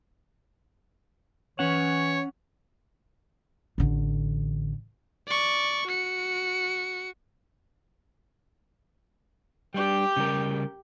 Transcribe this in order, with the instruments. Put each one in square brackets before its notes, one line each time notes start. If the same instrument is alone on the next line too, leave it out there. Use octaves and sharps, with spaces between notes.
[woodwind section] E3 [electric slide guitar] C#4 F#5 [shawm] C#5
[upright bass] A1 D3
[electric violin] D5 C#6
F#4 C#7
[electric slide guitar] G3 D4 [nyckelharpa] G4 G5
[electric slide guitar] C#3 G3 A#4